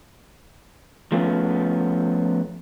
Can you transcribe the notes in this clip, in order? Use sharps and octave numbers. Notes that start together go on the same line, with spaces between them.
F3 A3 B3 C#4 F4